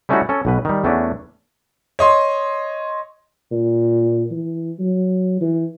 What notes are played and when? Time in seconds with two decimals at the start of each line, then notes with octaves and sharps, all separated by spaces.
0.09 G3 A3 C#4 D#4 E4 F#4
0.29 C#4 A4
0.45 B1 B2 B4
0.65 D#3 G3
0.84 E2 A3 B3 C#4 D4
1.99 C#5 D#5 C6
3.51 A#2
4.31 E3
4.79 F#3
5.41 E3